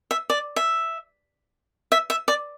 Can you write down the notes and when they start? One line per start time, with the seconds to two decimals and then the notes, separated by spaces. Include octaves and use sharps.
0.11 E5
0.30 D5
0.56 E5
1.92 E5
2.10 E5
2.28 D5